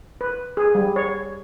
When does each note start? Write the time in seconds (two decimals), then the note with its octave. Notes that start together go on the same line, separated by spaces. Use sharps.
0.21 B4
0.57 G#4
0.75 G3
0.96 C#5